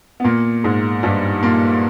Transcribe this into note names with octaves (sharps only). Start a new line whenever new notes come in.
B3
A#2 A#3
G#2 G#3
G2 G3
A#2 A#3